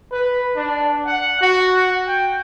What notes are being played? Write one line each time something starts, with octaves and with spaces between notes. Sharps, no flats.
B4
D4
F#5
F#4
G5